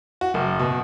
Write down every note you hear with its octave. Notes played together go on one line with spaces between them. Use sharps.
F#4
F#1
B2